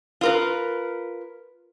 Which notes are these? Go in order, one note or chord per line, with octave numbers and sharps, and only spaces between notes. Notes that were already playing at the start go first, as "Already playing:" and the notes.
F4 A#4 B4